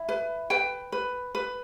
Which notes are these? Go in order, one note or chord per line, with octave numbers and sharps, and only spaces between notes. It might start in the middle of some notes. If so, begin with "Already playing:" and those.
Already playing: E4
B4
B4 G5
B4
B4